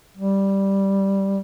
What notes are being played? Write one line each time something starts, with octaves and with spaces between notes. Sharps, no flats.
G3